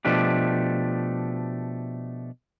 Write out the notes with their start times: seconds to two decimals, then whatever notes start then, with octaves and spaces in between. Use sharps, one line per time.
0.05 B2 F3 A3 D4 G4